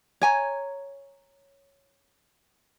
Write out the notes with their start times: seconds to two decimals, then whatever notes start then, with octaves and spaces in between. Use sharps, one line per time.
0.21 C#5 G#5 A#5